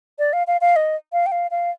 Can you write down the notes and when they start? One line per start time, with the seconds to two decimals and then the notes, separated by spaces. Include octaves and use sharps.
0.19 D5
0.33 F5
0.47 F5
0.61 F5
0.76 D#5
1.13 F5
1.26 G5
1.32 F5
1.51 F5